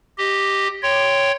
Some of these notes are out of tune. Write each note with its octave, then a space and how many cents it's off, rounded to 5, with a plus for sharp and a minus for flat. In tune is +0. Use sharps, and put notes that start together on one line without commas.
G4 +0 D#5 +0
C#5 +0 G5 +0 C6 -15